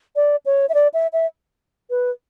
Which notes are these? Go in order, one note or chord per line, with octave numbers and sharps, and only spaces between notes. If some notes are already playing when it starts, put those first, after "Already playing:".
D5
C#5
E5
D5
E5
E5
B4